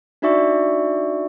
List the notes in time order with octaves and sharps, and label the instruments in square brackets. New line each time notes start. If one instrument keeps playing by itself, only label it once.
[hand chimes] D4 D#4 F#4 D5 E5 C#6